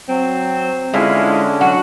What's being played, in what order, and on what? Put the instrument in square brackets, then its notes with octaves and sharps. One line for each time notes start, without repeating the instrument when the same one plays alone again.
[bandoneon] F#3 [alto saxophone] C4
[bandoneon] D3 C#4 D4 [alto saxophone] G#3 [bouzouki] E4 F4
[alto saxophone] F#3 [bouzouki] F#4